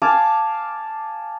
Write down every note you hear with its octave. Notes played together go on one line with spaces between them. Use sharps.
F5 G#5 A5 D6